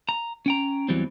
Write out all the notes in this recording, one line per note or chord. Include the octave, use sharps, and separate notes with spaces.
A#5
C#4 G5 A#5
E2 E3 F#3 G3 C4